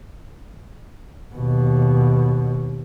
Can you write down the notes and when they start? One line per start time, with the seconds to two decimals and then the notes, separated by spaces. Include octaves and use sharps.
1.35 D#2 B2